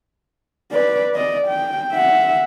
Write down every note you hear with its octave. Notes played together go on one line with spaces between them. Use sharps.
B4 D5
D5 D#5
G5
E5 F#5